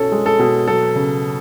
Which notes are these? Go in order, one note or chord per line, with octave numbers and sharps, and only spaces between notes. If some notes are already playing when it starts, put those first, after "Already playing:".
Already playing: C2 B2 C#4 A4
G#3
A4
B2
F#3 A4
C#3